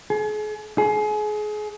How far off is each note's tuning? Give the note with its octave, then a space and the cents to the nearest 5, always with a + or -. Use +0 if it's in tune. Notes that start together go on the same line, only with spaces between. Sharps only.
G#4 +40
G#4 +30